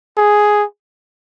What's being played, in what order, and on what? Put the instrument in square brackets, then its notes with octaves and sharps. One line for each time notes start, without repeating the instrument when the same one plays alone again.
[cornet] G#4